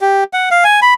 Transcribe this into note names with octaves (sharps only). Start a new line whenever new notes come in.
G4
F#5
F5
G#5
B5